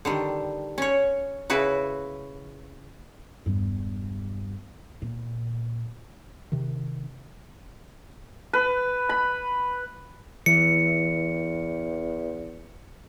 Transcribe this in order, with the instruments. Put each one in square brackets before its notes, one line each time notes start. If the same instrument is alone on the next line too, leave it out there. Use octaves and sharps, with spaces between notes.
[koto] D3 D#3 G3
C#4 C#5
C#3 E4 F#4 B4
[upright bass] E1 G2
A#2
[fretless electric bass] C3 D#3
[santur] B4
B5
[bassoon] E2 [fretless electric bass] E3 [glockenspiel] C#7